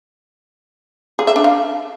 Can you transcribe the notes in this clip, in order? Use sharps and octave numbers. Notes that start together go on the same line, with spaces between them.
G#4
E5
D4
F5